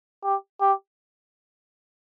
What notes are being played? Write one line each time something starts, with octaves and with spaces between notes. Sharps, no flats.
G4
G4